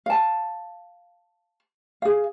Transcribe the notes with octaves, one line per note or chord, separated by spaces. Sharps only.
F5 A5
G#4 F5